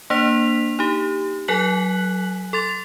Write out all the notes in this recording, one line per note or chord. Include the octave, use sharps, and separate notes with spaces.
A#3 D4 C5 B6 F7
D#4 G4
F#3 A4 G#5 F#6 B6 F#7
A4 C6 A6 F7